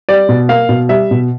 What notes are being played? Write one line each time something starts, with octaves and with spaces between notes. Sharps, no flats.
G3 D5
B2
A#3 F5
B2
G3 E5
B2